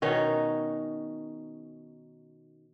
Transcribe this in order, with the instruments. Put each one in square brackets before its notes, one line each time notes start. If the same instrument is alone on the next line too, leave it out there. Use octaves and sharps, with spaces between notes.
[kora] B2 D#3 C#4 D#4